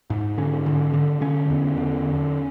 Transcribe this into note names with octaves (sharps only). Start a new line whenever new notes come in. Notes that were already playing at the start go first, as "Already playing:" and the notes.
G#2
D3 C#4
D3
D3
D3 C#4
E2
D3